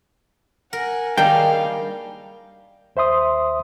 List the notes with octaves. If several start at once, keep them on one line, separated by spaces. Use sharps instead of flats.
A#4 F#5 G#5
D#3 G3 A#3 D4 G#4 F5 G5
D#2 C5 E5 C6 D#6